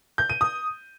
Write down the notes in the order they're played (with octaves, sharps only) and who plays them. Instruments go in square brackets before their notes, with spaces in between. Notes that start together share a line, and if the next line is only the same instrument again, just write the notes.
[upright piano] G6
D#7
D#6